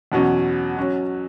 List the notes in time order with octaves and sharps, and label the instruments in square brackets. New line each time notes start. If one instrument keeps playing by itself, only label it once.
[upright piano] E2 B2 F#3 C#4
F#3 C#4 F#4